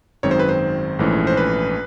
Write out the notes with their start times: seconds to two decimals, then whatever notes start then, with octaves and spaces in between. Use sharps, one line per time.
0.23 G#1 F#2 D#3 G#3 C4 C#5
0.31 C5
0.39 B4
0.49 C5
0.99 A#1 G#2 E3 A3 C#4
1.27 C5
1.37 B4